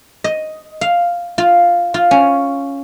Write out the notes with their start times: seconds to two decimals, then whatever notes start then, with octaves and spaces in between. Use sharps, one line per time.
0.24 D#5
0.81 F5
1.38 F4
1.94 F4
2.11 C#4